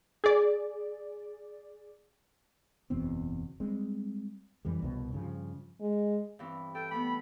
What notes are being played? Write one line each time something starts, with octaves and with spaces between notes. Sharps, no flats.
G#4 D5
F#1 E2 B2 C4
G3 G#3 C4
F2 E3 G3
C2 B2
G2 C#3 F3
G#3
G2 E3 C4
A4 G5
G3 A3 B3 B5